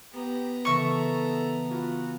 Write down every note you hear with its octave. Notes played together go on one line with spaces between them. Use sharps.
B3 G4 A#5
C#3 E3 A4 A#4 E5 C#6
F4 F#4 B4 G#5